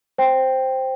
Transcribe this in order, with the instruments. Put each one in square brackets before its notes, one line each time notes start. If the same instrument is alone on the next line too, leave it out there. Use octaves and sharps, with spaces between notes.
[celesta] C5 G5